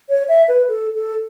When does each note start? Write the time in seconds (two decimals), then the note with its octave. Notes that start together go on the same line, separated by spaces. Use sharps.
0.09 C#5
0.28 E5
0.48 B4
0.68 A4
0.95 A4